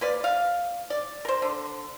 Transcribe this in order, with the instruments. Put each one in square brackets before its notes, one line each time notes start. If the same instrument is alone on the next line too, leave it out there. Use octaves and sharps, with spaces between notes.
[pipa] A#3 B4 D5
F5
D5
A#4 C5
D3